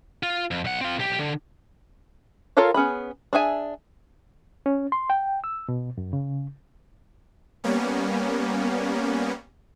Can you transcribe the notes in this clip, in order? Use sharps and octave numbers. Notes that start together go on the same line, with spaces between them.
F4
F2
B1 F#5
C4 F4
B1 G4
D3
F4 A4 A#4 C#5 F5
B3 C#4 G#4 B5
D4 G#4 E5 G#5
C#4
C6
G5
E6
B2
F#2
C#3
G3 A#3 B3 C#4